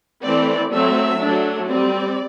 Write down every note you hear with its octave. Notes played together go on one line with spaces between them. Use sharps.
E3 A3 C4 D5
F#3 A3 C4 E5
F#3 A3 D4
G3 C4 D5